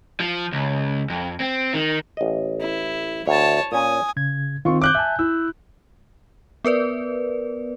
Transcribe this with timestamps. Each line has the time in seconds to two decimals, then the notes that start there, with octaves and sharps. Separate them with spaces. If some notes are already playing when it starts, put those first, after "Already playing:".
0.20 F3
0.52 C#2
1.10 F2
1.40 C4
1.74 D#3
2.17 A1 D#5
2.60 E4
3.27 D2 C#5 A5
3.72 A#2 C#4 G#5 D#6
4.17 C#3 G#6
4.65 D#3 C4 F4 C6 C#6
4.82 D6 F#6 G6
4.95 E5 G#5 A5
5.19 E4 E6
6.65 B3 A#4 B4 D5